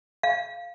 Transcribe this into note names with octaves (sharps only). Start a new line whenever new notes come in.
F5